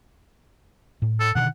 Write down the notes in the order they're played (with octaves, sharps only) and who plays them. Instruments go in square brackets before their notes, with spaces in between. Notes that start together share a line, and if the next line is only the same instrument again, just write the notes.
[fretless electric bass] A2
[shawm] A4
[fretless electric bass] B2 D3 D#3 [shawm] F#5